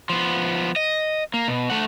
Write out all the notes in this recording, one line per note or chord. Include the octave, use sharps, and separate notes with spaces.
F3 B3
D#5
A#3
B2
A3 F#5